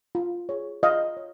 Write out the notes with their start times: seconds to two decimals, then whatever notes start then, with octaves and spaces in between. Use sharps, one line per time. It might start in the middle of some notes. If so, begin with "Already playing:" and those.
0.15 F4
0.49 G#4 C#5
0.83 F4 D#5 F5
1.17 C#5